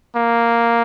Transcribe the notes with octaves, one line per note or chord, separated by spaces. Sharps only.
A#3